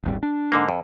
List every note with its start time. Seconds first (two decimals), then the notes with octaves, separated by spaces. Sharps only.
0.04 D#1 G#1 G3
0.23 D4
0.52 G#2 D3 A#3
0.69 F2